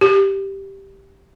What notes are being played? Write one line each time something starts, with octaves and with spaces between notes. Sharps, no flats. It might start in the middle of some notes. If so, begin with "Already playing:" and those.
G4